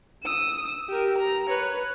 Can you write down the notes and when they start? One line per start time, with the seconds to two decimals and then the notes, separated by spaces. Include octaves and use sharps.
0.24 D#6 E6
0.89 G4 A#4
1.18 A#5
1.49 B4 C#5